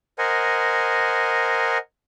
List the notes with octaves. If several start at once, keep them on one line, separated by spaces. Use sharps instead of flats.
A#4 C5 D#5 F#5 G#5